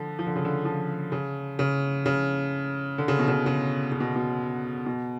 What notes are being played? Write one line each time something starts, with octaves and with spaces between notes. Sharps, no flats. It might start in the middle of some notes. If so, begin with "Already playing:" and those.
Already playing: D3 F3
F3
D3
C#3
D3
F3
C#3
C#3
C#3
D3
C#3
B2
C#3
C#3
C#3
B2
B2
B2